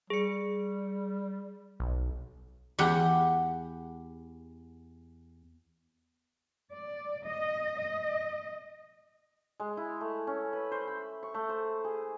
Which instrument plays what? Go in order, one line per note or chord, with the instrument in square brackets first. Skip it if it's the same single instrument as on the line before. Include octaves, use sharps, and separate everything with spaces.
[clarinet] G3 [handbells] G#4 C#7
[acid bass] B1
[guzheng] E2 G4 F#5
[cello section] D5
D#5
D#5
[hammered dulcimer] G#3
E4
A3
C#4
B4
C5
B5
C#6
A3
C5
G#4